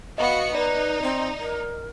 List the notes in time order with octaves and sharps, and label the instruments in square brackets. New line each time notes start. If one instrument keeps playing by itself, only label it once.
[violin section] B3 F#4 C#7 [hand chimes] D#5 [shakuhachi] F5
[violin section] D#4 [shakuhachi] B4 [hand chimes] D5
[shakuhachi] C4
A#4